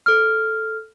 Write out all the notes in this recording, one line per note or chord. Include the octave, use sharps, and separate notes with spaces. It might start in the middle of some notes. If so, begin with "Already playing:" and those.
A4 F6